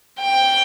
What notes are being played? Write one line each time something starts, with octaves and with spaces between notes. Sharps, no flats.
G5